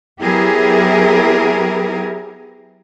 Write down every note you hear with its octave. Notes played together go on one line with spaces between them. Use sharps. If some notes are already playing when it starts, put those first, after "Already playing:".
F#3 B3 E4 G4 G#4 A#4